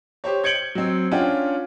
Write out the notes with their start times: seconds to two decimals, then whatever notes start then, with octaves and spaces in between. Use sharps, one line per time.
0.24 G4 C5 C#5
0.44 G6 G#6 C#7 D7 F#7 G7
0.75 F#3 C4
1.11 C#4 D4 F4 F#5 G5